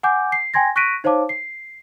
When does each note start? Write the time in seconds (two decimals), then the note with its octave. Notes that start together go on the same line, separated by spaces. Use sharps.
0.03 F#5 G#5 D6 G6
0.32 C7
0.54 G5 G#5 C6 G#6 A#6
0.76 C#6 F#6 A#6 B6 D7 D#7
1.04 D#4 C5 C#5 F5 A5 D6
1.29 C7